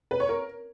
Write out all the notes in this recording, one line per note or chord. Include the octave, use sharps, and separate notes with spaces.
B4
C#5
A#4